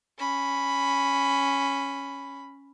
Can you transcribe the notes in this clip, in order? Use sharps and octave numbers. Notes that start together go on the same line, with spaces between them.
C#4 B5